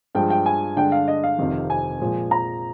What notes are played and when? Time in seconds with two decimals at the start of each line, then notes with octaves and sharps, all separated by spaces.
0.15 G2 F3 G#3 G5
0.30 G5
0.46 G#5
0.76 G2 D3 G#3 D4 G5
0.92 F5
1.08 D#5
1.24 F5
1.38 F1 F2 C3 D#3
1.70 G#5
2.00 A#2 F3 G#3
2.31 A#5